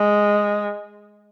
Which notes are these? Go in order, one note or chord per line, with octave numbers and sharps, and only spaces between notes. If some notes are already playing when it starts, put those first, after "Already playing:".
Already playing: G#3